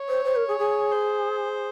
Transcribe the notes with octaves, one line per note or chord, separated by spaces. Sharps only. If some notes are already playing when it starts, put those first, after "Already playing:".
Already playing: C#5
C5
C5
A#4
G#4
G#4
C5